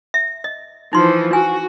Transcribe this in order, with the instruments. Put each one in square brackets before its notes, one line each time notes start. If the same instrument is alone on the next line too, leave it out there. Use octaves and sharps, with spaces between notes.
[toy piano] E5
D#5
[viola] E3 F3 [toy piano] D#4 C6
[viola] F#4 [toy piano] G#5